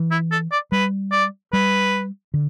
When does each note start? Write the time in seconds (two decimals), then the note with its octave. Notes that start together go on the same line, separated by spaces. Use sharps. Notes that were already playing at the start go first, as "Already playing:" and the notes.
Already playing: E3
0.11 E4
0.31 A4
0.52 D5
0.72 G3 B4
1.12 D5
1.53 G3 B4
2.34 D3